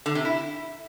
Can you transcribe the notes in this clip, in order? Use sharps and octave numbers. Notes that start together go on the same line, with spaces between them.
D3
C3
E4